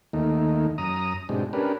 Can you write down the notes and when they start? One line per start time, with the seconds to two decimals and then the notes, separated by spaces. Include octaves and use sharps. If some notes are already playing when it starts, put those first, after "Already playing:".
0.13 D#2 D#3 A3 A#3 D#4
0.78 F#2 A#5 D#6
1.29 G#2 B2 G#3 C4 D4 G4
1.53 C#4 D4 G4 A#4 B4